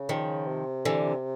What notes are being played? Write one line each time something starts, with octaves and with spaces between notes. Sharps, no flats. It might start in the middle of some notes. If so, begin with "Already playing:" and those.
Already playing: C#3
D#3 F3
C3
D3 E3